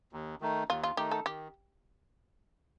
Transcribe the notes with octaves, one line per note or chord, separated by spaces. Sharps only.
D#2
D#3 A3 D#4
D#2 F4
F4
D#3 A3 D#4 G4
A4
D#3 G4